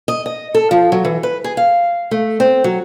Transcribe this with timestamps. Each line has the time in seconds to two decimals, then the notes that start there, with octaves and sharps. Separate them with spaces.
0.08 D#5
0.26 D#5
0.55 A4
0.71 F3
0.92 F#3
1.05 E3
1.23 B4
1.44 G#4
1.57 F5
2.11 A3
2.40 C4
2.64 F#3